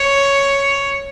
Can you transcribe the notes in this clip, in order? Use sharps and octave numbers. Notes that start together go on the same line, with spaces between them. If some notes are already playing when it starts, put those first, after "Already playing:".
Already playing: C#5